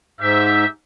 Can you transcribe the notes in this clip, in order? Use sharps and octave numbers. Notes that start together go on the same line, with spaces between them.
G#2 G4 E5